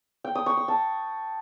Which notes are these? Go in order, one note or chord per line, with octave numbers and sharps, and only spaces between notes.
G5
D#6
C#6
D#6
A5